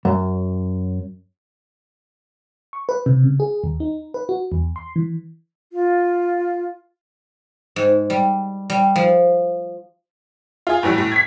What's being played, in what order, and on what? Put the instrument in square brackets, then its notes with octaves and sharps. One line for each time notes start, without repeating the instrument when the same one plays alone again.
[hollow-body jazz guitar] F#2
[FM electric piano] C#6
B4
C3
C#3
G#4
D#2
D#4
B4
F#4
E2
C6
E3
[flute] F4
[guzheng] G#2
G3
G3
F3
[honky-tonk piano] F4 G#4
A2 E3 F#3 G3
A2
G#6 B6